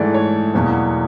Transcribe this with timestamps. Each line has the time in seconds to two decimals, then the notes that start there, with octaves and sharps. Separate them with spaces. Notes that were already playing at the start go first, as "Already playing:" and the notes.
Already playing: G#2 E3 A3 D5
0.14 C#5
0.54 E2 B2 F#3 A#3